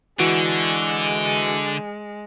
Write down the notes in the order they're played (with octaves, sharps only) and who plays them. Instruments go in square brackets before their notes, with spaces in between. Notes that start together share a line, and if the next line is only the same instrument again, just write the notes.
[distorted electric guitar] D3 [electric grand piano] E3 F#4 D7 [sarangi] G#3